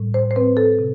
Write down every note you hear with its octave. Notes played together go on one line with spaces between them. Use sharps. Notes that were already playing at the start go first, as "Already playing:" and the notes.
Already playing: A2 G3
C5
C5
C4 B4
A4
C3